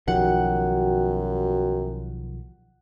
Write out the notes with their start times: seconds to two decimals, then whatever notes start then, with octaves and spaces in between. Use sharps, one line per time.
0.08 B1 F#2 D#3 F3 F#4 G4 F#5 G5